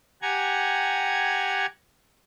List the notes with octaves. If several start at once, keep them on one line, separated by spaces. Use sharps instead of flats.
G4 F#5 G#5 A#5 G#6